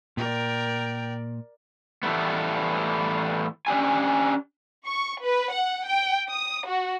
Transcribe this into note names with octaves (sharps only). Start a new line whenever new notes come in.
A#2 A#4 D5 G5
A2 E3 G3 A3 B3
C#4 D4 G4 G#5
C#6
B4
F#5
G5
D#6
F#4